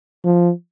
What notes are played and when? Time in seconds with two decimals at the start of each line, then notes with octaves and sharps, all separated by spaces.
0.24 F3